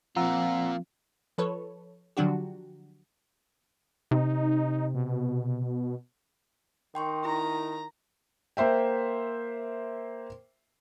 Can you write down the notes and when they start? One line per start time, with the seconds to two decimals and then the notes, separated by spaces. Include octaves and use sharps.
0.16 F3 A#3 C4 F4 F#5 A#5 E6
1.38 F3 A4 B4 C#5
2.17 D3 F3 F#3 D4 F#4 G4
4.11 C3 D#4
4.94 B2
6.95 D#3 G5 C6 C#6
7.25 E4 A#5
8.57 A#3 C5 E5 G5